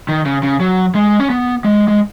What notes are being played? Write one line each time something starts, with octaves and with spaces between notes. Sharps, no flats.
D#3
C#3
C#3
F#3
G#3
C#4
B3
G#3
G#3